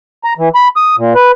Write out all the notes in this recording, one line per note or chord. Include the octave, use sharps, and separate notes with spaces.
A#5
E3
B5
D#6
A#2
B4